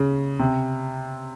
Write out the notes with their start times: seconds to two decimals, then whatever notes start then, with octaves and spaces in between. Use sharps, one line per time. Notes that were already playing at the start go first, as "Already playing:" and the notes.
Already playing: C#3
0.39 C3